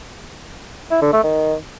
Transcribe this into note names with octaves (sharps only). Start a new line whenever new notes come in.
E4
D3
A3
D#3